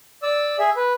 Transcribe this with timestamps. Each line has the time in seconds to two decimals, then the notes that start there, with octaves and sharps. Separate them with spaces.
0.23 D5 E6
0.59 G#4 E5
0.77 B4